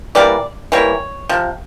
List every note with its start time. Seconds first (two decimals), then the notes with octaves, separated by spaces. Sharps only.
0.15 E3 G3 A#3 D5
0.72 E3 G3 A#3 C#5
1.29 C3 F3